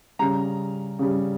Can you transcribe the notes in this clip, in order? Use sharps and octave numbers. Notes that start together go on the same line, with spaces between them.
C#3 G3 A#5
C#3 G3